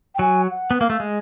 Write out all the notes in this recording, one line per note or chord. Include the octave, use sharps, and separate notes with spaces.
G5
F#3 G#5
F#5
B3
A#3 F5
A3
G#3